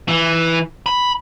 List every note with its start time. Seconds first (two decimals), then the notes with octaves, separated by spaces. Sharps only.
0.08 E3
0.86 B5